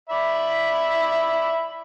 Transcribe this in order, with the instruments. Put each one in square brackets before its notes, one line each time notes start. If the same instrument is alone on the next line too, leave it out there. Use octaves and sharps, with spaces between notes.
[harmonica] D5 E5 B5